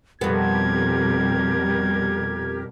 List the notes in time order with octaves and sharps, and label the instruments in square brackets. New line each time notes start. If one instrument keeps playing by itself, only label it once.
[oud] F2 B3 [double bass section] B2 G3 [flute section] G4 A#4 [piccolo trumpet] G#6